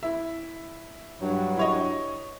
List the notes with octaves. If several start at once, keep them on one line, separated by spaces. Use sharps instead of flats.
E4 E5
G2 F#3
E4 C#5 D#5